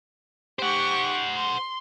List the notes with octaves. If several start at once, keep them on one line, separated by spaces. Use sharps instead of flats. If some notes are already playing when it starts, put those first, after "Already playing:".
G4 C5 F#5 C#6
C6